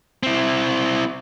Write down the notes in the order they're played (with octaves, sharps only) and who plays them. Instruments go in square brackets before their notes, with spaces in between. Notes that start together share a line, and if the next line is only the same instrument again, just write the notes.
[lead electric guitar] C4 E4